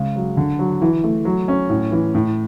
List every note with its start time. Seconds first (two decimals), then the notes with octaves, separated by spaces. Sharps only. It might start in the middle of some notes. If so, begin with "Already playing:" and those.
Already playing: C#3 G#3
0.16 F#3
0.37 D3
0.59 F#3
0.82 E3
1.04 A3
1.25 F#3
1.48 C#4
1.70 A2
1.92 E3
2.15 A2